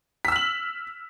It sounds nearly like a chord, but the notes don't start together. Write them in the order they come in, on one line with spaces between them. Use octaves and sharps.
B6 E6 F6 F#7